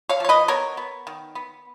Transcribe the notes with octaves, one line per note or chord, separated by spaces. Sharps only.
C#5 F5
F3 C#5
B4 D#5
B3 A#4 C#5
B3
D#3
B3